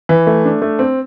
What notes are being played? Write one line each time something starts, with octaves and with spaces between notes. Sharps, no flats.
E3
A3
D4
A3
C4